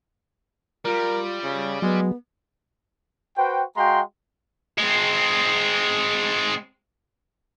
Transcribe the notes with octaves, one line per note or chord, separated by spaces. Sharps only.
G3 F4 A#4
C#3
F#3 G#3 B3
F#4 B4 C5 G5
G#3 F#4 F5 G5 A#5 C6
G#3 C4